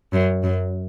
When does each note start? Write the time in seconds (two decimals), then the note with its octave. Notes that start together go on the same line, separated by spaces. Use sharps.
0.13 F#2
0.44 F#2